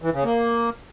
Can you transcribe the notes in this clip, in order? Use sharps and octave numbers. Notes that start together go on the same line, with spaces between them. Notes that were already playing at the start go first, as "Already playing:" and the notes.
E3
C#3
A#3